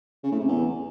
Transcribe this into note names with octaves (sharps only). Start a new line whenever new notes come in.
C#3
A2
C3
E2